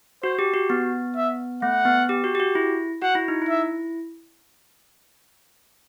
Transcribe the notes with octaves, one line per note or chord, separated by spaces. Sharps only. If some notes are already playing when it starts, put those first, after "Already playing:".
F#4 C5
G4
F#4
B3
E5
A3 F#5
B3
G4
F#4
G4
F#4
E4
F#4 F#5
E4
D#4
E4
E5